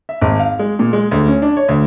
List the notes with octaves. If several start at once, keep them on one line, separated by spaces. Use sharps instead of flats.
E5
G#1
F5
G#3
A#2
G#3
D2
C#4
D4
C#5
D2